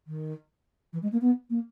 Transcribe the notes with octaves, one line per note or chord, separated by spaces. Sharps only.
D#3
E3
G#3
A#3
B3
A#3